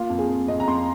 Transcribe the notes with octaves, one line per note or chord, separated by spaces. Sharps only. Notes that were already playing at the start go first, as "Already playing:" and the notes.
Already playing: A#3 F4
F2
G#4
F2
F2 D#5
A#5
F2 C6